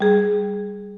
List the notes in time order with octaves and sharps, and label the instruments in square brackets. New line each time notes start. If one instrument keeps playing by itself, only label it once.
[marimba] G3 G#4